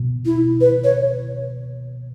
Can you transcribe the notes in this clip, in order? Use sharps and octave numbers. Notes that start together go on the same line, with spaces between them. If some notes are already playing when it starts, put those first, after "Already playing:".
Already playing: B2
E4
B4
C#5